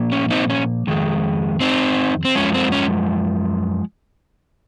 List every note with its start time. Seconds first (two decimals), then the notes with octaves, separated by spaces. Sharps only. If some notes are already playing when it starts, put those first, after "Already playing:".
Already playing: A#2 F3 A#3
0.12 C#4
0.30 C4 D#4
0.50 C#4
0.87 F2 D#3 G#3
1.61 C4 D#4
2.25 C4
2.35 F#2 F3 G#3 C#4
2.54 C4
2.72 C#4